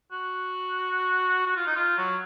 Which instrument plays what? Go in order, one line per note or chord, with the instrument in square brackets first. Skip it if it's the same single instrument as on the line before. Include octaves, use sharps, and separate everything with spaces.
[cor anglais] F#4
F#4
F4
D#4
F4
F#3